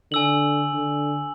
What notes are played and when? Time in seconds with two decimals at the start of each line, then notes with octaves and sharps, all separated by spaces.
0.12 D3 G#5 E6 F#7
0.73 D3